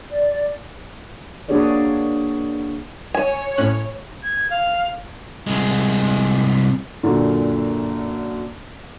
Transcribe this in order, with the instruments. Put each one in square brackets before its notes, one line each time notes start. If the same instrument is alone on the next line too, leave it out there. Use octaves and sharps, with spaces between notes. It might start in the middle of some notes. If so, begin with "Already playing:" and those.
[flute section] D5
[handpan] A#3 D4 F#4 G#4 C#5 D5
[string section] C#5 [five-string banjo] G#5
[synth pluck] A2 C#4 F#6
[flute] G#6
F5
[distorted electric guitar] C2 G#3
[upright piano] F#2 A#2 D3